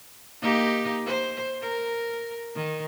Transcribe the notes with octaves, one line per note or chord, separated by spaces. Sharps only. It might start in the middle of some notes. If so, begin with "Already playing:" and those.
A#3 D#4 G4
C5
A#4
D#3